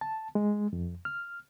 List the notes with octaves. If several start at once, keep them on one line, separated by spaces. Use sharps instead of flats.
A5
G#3
F2
F6